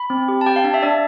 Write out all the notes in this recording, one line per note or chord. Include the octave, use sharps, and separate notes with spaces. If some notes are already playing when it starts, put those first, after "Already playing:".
Already playing: B5
C4
G4
A5
G4 G5
F5
D4 A5
E5
D4 D5